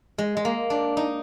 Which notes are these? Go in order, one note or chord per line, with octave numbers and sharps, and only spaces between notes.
G#3
G#3
A#3
D4
D#4